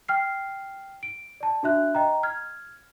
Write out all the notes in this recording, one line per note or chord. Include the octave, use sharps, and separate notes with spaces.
G5 F6 C7
D7
D5 A5
D4 F#4 E5 F#6
D#5 G5 A#5
F6 G#6